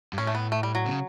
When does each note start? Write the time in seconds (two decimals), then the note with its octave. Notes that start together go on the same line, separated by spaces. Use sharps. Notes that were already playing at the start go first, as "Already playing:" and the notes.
0.13 G2
0.18 A2 C#4
0.27 A3
0.35 B3
0.52 A3
0.63 G3
0.75 F#3
0.86 C#3